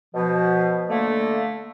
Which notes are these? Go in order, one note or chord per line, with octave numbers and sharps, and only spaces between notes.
B2 F3
D3 A3 A#3